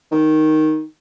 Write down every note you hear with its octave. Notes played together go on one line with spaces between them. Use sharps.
D#3